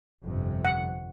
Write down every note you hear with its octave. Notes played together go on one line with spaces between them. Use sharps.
G1 F2 C3
F#5